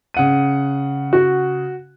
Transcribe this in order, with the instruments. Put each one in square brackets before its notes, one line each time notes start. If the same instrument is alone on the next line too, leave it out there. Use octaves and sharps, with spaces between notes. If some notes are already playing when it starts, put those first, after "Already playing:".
[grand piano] C#3 F#5 D#7
[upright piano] F#4